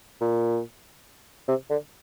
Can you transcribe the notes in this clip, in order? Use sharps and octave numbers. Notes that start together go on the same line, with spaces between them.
A#2
C3
D3